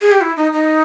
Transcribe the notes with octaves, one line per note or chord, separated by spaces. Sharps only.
G#4
G4
E4
D#4
D#4